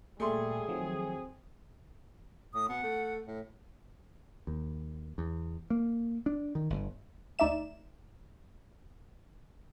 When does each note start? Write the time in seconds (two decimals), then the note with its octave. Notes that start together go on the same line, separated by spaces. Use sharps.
0.20 A#2 G3 A3 G#4 C6
0.68 D#3 F3 F#3 C4
2.54 A2 D#6
2.69 B2 F#5
2.83 A3
3.27 A2
4.47 D#2
5.18 E2
5.70 A#3
6.26 D4
6.55 D#3
6.70 G1
7.39 D2 D#4 D5 E5 E7